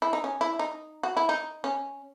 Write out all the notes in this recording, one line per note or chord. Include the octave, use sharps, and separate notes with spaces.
E4
D#4
C#4
E4
D#4
F#4
E4
D#4
C#4